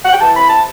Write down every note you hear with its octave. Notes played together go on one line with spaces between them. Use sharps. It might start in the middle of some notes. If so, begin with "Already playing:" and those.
F#5
G5
E3 A5
C3 B5
A5